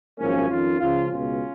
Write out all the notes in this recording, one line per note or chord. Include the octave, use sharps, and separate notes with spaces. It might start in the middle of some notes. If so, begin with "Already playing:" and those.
G#1 F#2 F3 A#3 C#4
F2 D#3 C#4 F4
C#2 C#3 F3 C#4 F4
C#2 B2 C#4 F4